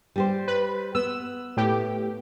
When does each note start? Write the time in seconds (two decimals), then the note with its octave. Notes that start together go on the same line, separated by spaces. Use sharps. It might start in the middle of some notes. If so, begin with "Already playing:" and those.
0.16 G3 G4 C5
0.48 B4
0.95 B3 E6
1.57 A2 G4